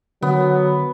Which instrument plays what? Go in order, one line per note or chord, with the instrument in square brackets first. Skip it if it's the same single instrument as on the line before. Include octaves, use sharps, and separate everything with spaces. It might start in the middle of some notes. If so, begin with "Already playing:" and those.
[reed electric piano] D3 [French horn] F#3 [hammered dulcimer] B3